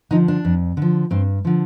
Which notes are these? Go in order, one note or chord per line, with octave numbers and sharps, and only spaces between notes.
D3 F3 D#4
D4
F2
D3 F3
G2 C4
D3 F3